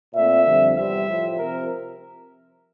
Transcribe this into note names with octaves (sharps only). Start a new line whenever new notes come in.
A#2 A3 C4 E5
F2 D3 G3 C4
E2 C3 G3 C4 E5
A2 F3 C4
C3 F3 C4 A#4